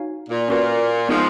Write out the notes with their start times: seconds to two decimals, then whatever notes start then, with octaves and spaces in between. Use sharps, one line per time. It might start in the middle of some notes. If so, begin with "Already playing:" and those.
Already playing: D#4 F#4 C#5 F5 G#5
0.29 A#2
0.48 A#2 C#4 F#4 B4
1.08 F3 G#3 B3 D#4 A#4